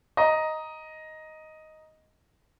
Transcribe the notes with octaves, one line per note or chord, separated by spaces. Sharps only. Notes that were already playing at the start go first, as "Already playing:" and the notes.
D#5 A#5